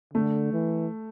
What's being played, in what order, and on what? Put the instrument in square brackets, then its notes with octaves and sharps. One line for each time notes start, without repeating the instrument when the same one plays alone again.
[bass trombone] D3 [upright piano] A3
[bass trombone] E3